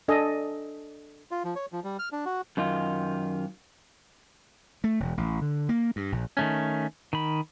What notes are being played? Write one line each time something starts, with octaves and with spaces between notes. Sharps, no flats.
D4 A4 D#5 G#5
F4
F3
C#5
F3
G3
F6
D4
F#4
F#2 D#3 F4
A3
E1
A1
D3
A#3
G2
A#1
D#3 A3 C#4
D#3 B5